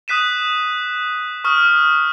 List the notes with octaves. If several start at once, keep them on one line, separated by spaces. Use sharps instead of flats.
D#6 F#6 B6 D#7 E7
C#6 D#6 F6